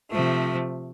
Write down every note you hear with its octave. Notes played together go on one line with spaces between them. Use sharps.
C3 F3 A3